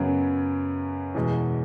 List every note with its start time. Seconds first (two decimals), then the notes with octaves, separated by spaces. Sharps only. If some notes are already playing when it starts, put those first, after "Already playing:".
Already playing: F#2 C#3 F#3 B3
1.15 E2 B2 G#3